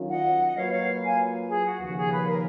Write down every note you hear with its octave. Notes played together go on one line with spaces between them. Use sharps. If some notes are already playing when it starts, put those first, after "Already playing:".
Already playing: D#3 F#3 C#4 F4
D#5 F#5
F#5
F#3 A#3 F4 B4 C#5 F5
C#5 F5
F5 G#5
G#4
F#4
D#2 C#3 F3 F#4
G#4
B4
A#4